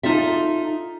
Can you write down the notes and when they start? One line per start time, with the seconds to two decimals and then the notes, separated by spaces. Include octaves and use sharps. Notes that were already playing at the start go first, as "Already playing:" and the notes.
0.03 D#4 F4 A4 E5